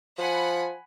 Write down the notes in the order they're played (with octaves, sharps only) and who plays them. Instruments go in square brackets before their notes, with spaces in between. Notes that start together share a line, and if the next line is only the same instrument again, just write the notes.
[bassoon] F3 [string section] F#5 G#5 B5